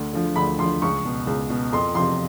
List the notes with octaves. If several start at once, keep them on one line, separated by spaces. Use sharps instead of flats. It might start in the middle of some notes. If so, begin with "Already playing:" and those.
Already playing: D2
D3 F3
D2 B5
D3 F3 C6
C#2 C#6
B2
C#2
B2
F2 C6
C3 F3 C6